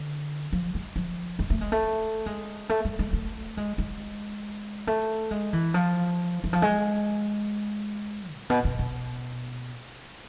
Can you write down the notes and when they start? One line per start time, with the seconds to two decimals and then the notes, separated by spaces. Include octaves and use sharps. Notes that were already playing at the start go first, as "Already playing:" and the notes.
Already playing: D3
0.53 F3
0.75 G#3
0.96 F3
1.39 G#3
1.50 A3
1.61 G#3
1.72 A3
2.26 G#3
2.69 A3
2.85 G#3
2.99 G#3
3.13 A3
3.57 G#3
3.78 G#3
4.87 A3
5.31 G#3
5.53 E3
5.74 F3
6.44 E3
6.53 F3
6.62 G#3
8.35 A2
8.50 B2
8.65 B2
8.79 B2